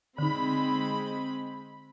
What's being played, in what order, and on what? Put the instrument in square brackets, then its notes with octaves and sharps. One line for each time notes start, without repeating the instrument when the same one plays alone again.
[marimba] D3 D#4 [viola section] G#3 C4 B5